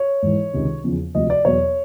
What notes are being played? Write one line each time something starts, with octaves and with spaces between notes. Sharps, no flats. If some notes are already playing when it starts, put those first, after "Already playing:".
Already playing: C#5
G#2 E3
C#2 C3 D#3
E2 C#3 F3
D2 C3 F3 D#5
D5
E2 B2 F#3 C#5